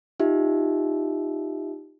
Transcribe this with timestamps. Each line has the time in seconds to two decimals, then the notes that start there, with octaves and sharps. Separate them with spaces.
0.20 D#4 F4 G4 E5